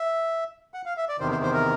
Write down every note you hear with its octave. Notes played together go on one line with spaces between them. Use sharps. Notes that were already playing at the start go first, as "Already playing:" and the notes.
Already playing: E5
F#5
F5
E5
D5
E2 C3 D#3 C5
C5
C5
A#4